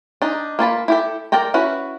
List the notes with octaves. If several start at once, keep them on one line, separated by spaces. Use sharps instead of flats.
D4 D#4
A#3 F4 A5 B5
E4 G4 A4
A4 A#4 D5 G5 A#5
C#4 E4 F#4 B4